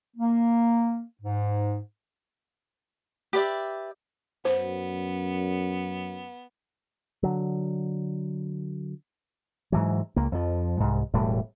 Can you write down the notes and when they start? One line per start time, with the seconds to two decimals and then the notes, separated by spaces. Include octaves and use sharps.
0.17 A#3
1.22 G#2
3.33 G4 B4 D5 E5
4.45 F#2 B3 C5
7.23 D3 F#3
9.72 G#2 E3 F#3
10.16 C#2 A#3
10.32 F2 F3
10.80 C2 G#2
11.14 E1 A2 G3